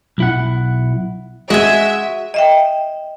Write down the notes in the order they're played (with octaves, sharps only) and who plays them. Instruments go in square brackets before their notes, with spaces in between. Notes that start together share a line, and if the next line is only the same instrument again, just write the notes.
[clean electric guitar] B1 E4 F#5
[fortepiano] G#3 [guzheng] F#4 G#5 [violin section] E5
[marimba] D#5 E5 G5